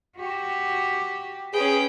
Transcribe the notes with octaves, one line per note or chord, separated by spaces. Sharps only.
F#4 G4
C#4 G#4 B4 G5